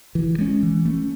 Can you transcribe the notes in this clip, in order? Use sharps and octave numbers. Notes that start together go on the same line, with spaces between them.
E3
G#3 C#4
E3
A3 C#4